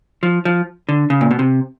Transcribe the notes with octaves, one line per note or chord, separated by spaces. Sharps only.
F3
F3
D3
C#3
A#2
B2
C3